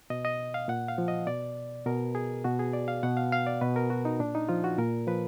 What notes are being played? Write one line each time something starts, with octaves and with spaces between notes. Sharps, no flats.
B2 D#5
D#5
F5
A#2 F#5
F5
F3
D#5
B2 D5
B2 A#4
G#4
B2 F#4
G#4
D5
F5
B2 F#5
F5
F5
D5
B2 B4
A#4
F#4
D#4
A#2 D4
D#4
F3 F4
F#4
A#2 A#4
F3 B4